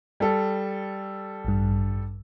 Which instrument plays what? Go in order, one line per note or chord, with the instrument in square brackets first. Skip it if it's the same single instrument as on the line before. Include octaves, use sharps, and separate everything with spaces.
[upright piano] G3 A4
[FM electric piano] A1 G2